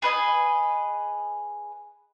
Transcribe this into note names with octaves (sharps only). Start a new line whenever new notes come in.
G#4 B4 D#5 G#5